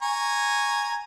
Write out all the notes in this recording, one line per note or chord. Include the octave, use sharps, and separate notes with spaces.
G#5 A#5 C#6